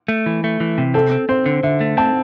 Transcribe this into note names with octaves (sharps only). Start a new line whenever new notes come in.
A3
E3
A3
E3
C3
C4 A4
C4
C4 C5
D3
D3 E5
A3
C4 A5